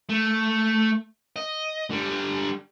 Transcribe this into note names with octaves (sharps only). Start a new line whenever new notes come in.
A3
D#5
D3 G3